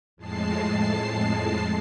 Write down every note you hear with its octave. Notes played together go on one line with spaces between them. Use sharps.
F2 A2 G#3 A5 C7